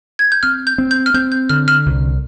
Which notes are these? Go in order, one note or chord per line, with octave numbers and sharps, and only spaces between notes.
G#6
G6
C4 F6
G6
C4
G6
F6
C4 G6
G6
D3 F6
F6
C2